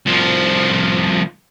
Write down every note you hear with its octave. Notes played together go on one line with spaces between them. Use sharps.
C2 F3